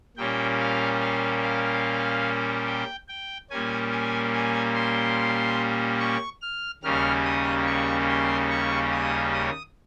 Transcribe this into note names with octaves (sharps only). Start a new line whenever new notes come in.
A#2 G3 A#3 C#4 G5
F5
F5
F5
G5
G5
A#2 G3 A#3 C#4 G#5
G#5
G#5
C6
C#6
F6
D#2 C#3 G3 A#3 C#4 F6
D#6
C#6
C6
C#6
D#6
D#6